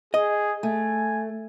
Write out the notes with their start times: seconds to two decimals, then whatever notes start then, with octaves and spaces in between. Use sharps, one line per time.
0.14 G#4 D#5
0.63 A3 G#5